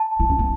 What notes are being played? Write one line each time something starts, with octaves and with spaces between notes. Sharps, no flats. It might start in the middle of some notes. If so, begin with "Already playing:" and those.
Already playing: A5
E4
C#4
B3